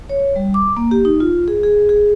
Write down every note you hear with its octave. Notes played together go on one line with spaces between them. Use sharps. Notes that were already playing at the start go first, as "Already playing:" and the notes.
C#5
G3
D6
A#3
G4
D#4
F4
G#4
G#4
G#4